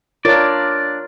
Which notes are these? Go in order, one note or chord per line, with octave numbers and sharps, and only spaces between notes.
D4 F4 A#4 C#5 D5